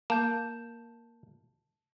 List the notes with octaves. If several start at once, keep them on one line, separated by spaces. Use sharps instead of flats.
A#3 A5 G6